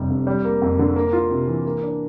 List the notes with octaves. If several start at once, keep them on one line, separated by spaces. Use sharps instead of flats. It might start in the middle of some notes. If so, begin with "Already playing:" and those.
Already playing: F1 D3 G3
F2
G3
A#3
F2
D3
A#3
F4
C3
E3
A#3
D4